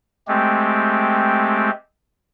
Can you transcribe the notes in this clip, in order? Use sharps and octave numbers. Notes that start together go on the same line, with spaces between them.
G#3 A3 C4 G4